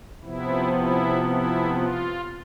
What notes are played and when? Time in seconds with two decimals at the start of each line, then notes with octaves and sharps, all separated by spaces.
0.22 C3 F3 B3 E4
0.73 E4
1.24 E4
1.75 F4